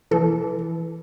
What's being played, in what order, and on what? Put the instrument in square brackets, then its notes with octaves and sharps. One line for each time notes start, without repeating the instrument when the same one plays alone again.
[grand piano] E3 [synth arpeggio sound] A4